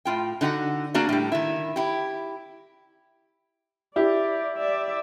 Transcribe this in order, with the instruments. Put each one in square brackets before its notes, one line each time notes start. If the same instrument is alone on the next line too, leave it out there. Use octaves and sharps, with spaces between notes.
[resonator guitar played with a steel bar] A2 F4 G5
D3 D#4 F#4 F#5
A#3 D4 F#4 G#4 D5
A2 G3
D#3 E4
E4 G4
[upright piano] E4 G4 [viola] D5
[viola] D5 E5